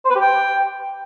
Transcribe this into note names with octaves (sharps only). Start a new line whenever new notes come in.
C5
B4
G4
G5